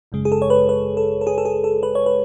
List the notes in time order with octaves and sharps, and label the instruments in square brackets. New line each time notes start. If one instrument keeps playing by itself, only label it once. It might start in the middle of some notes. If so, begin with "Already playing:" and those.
[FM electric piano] G#1 F#2 C#3 G#3
G#4
A4
C#5
B4
B4
A4
A4
G#4
A4
G#4
A4
B4
C#5
B4